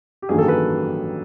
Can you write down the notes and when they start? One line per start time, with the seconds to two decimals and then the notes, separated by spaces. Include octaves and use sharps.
0.22 G4
0.29 A1 G2 D#3 F#3 A#3 G#4
0.38 A4
0.48 B4